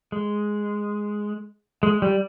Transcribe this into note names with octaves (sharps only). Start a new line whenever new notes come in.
G#3
G#3
G3